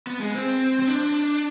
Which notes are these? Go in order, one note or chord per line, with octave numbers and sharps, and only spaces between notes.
B3
G#3
C4
C4
D4